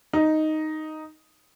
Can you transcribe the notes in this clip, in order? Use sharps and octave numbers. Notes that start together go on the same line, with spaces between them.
D#4